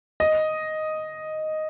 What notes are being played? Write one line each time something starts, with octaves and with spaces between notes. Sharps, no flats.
D#5